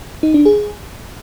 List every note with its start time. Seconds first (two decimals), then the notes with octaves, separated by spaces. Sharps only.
0.23 D#4
0.34 D4
0.46 G#4